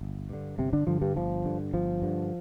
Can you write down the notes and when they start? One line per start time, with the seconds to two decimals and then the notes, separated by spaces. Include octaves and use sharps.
0.01 G1
0.29 G2 D3
0.58 G1 C3 C4
0.73 D3 D4
0.87 G2 D3 F3
1.01 G2 G3
1.16 G1 F3
1.45 G2 D3
1.73 G1 F3
2.02 G2 D3